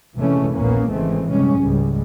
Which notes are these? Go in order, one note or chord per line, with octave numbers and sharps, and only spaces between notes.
C3 E3 G#3 A3 C#4
A#1 D#2 A#2 A#3 B3 C#4
G#1 C#3 E3 G#3 A3 C4
F#1 C3 G3 G#3 C#4
C#2 G#2 G3 G#3